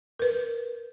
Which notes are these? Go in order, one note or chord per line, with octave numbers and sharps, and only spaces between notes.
A#4 B4